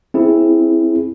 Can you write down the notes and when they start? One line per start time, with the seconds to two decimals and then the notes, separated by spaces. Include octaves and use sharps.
0.14 C4 E4 G#4